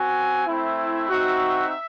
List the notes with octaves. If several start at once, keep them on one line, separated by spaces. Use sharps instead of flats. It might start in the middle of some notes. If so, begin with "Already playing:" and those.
Already playing: C4 F#4 G#5
A3 C4 E4
E5
C4 D#4 F#4